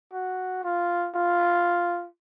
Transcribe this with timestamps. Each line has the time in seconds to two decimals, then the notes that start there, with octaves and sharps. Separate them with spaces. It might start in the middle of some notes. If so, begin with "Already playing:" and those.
0.13 F#4
0.64 F4
1.15 F4